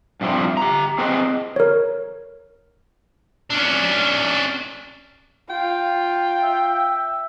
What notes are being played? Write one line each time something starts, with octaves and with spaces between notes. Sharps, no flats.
G2 C3 F3 E4
G4 A#5
C4 G#4 B4 D#5
A#4 C#5
C#4 D4
F4 G5
E5